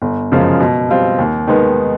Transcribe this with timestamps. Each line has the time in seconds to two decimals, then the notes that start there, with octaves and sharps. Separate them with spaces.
0.02 G1
0.32 F#2 C#3 F3 G#3
0.60 B2
0.89 G3 C4 F4
1.18 D#2
1.47 D#3 G#3 B3